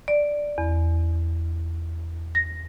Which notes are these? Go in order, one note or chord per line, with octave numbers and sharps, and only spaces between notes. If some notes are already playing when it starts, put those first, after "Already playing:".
D5
E2
A#6